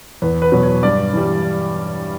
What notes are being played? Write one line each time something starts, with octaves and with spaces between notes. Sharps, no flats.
E2 B4
B4
B2 F#3
C#5
G2 D5
E3 G3